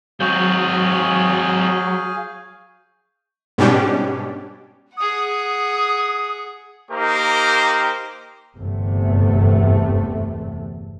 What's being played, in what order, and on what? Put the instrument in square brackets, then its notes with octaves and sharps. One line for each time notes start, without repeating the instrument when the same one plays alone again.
[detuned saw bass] F#3 [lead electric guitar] G#3 C4 [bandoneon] G#4 F5 G#5 [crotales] C#6 G6
[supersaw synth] G#2 B2 G3 C#4 D4 G4
[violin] G#4 F#5 [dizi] D#6
[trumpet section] A#3 D#4 G4 A#4 C5
[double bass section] G1 E2 C3 A3